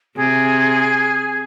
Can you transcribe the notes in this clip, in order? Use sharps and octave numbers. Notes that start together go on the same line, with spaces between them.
C3 G#4